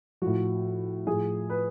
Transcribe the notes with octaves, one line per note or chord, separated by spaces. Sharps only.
A2 F3 F#4
A2 F3 G#4
B4